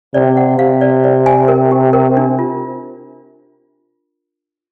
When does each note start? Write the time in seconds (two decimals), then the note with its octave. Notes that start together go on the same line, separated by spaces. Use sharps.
0.14 C3 D5
0.37 F#5
0.58 C3 F5
0.81 D5
1.04 D5
1.26 G#5
1.48 A#4
1.71 G4
1.93 A#4
2.17 D4
2.39 F4